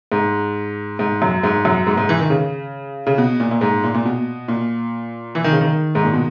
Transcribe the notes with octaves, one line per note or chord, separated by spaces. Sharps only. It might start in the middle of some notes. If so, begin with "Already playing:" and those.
G#2
G#2
F#2
G#2
F#2
G#2
G#2
E3
D#3
C#3
C#3
B2
A#2
A#2
G#2
A#2
A#2
B2
A#2
E3
D#3
C#3
D#3
G#2
A#2
B2